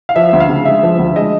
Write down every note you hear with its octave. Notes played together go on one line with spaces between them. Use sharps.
F5
F3 E5
D2
F5
C#3
G#3 E5
F3
D2
G#3 D#5